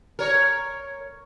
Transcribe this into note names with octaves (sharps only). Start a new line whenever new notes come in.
A#4 C#5